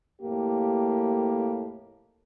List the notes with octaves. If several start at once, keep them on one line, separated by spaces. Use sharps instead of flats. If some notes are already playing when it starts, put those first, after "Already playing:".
F2 A2 A#3 G4